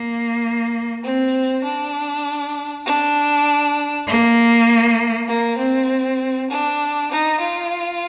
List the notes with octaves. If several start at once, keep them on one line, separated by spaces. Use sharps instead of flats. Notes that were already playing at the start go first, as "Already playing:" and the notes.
Already playing: A#3
C4
D4
D4
A#3
A#3
C4
D4
D#4
F4